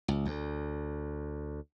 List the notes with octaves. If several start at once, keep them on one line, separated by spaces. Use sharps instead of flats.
C#2
D2